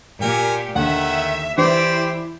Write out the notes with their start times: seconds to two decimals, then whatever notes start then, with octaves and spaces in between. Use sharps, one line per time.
0.21 A#2 G4 A#4 G#5
0.76 D#2 D3 D#3 E5 F#5
1.58 E3 E4 G4 C5 D5 G5